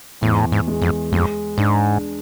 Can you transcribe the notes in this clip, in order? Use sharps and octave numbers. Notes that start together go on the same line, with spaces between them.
E2 A2
G#2
A2
G#2
G#3
F2
F2 G#3
G#2 D4